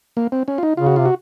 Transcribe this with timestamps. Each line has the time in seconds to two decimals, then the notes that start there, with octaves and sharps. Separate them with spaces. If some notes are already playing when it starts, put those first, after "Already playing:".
0.17 A#3
0.32 C4
0.48 C#4
0.58 F4
0.63 D#4
0.77 C#3 F4
0.86 F#4
0.96 C3 F4
1.05 F#4